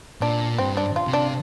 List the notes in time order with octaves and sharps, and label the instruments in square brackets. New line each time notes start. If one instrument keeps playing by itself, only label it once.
[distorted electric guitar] A#2 [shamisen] D4
[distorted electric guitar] G2 [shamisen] C4
[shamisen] D4
F4
[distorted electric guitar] C3
[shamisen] D4